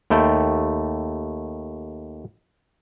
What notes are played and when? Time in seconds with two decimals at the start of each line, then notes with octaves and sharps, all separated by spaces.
0.10 D#2 A3 G5